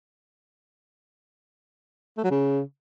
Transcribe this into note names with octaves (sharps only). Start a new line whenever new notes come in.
A3
F#3
C#3